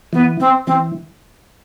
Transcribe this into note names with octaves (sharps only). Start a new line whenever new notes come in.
E3 B3
C4
E3 C4